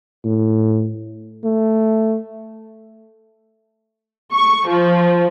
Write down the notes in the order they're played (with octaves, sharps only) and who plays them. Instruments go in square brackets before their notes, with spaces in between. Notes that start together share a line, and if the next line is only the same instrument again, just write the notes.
[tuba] A2
[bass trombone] A3
[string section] C#6
F3